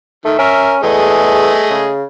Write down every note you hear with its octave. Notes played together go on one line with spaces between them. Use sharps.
D#3 A3
C#4 A#4 E5
E2 A3 G#4 D#5
C#3